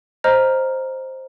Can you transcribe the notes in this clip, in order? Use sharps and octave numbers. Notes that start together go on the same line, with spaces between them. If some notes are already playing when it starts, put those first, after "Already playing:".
C5 D#5 A#5 F6